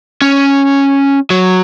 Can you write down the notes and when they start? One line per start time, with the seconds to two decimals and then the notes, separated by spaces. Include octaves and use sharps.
0.22 C#4
1.30 F#3